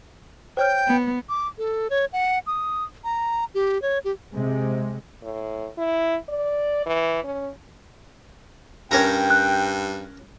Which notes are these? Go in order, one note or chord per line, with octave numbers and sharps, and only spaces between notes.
C5 C#5 G5 F6
B3
D6
A4
C#5
F#5
D#6
A#5
G4
C#5
G4
C3 G#3
A2
E4
D5
E3
C#4
G2 C#4 A#4 G5 A#5
F#6